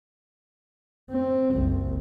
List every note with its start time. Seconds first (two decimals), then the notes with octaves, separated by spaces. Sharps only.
1.10 C4
1.53 F#1 C2